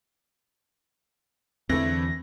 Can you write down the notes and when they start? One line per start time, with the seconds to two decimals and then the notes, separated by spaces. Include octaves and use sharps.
1.69 E2 D3 E3 A3 C4 E4 A#6